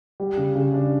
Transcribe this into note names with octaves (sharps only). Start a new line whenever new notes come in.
G3
C#3
C#3
D4